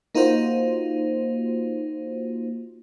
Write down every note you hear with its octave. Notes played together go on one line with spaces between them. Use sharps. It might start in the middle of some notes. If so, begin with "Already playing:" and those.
A#3 D#4 F4 F#4 C5